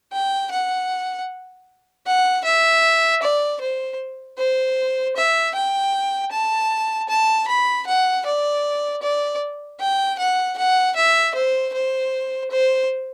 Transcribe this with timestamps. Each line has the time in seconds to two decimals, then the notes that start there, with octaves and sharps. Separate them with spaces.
0.12 G5
0.51 F#5
2.06 F#5
2.44 E5
3.22 D5
3.61 C5
4.38 C5
5.16 E5
5.55 G5
6.32 A5
7.09 A5
7.48 B5
7.87 F#5
8.25 D5
9.02 D5
9.80 G5
10.19 F#5
10.58 F#5
10.96 E5
11.34 C5
11.74 C5
12.51 C5